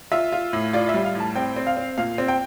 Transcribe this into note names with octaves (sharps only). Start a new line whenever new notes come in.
F4 E5
F4
A2
F4 D5
E5
G3
F5
A2
A5
C4 G5
C4
F5
C4
A#2 F5
C4
G5